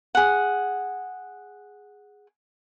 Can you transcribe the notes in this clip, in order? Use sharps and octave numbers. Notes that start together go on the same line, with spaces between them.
G#4 F#5